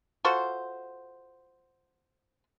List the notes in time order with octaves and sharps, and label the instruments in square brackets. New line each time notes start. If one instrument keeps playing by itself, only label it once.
[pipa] F4 F#4 A4 C5